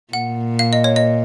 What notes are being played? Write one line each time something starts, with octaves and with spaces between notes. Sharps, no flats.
A#2 F#5
F5
D#5
C#5
D#5